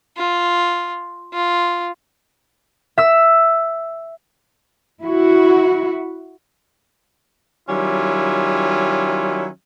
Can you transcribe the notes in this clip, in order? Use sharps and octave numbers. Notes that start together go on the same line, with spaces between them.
F4
F4
E5 E6
E4 F#4
D#3 F#3 G3 C#4 E4 F4